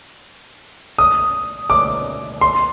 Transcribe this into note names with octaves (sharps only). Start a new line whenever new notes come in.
D#6
D6
C6